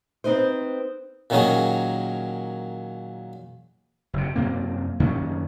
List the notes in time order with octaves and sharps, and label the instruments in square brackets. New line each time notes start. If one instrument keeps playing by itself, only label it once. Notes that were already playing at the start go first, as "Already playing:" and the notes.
[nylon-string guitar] C4 D#4 B4 C5
[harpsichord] A#2 D#3 F#3 C#4 G#4
[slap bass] F#1 C3
F#2 C3 A#3 C4
F#2 D#3 A#3 C#4